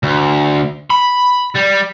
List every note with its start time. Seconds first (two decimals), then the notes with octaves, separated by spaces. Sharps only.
0.03 D2
0.90 B5
1.55 G3